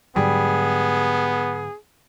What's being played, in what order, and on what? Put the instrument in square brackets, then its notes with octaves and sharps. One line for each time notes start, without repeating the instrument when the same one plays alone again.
[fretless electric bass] G#2 D3 F#3 [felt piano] G3 [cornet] B3 [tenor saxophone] G#4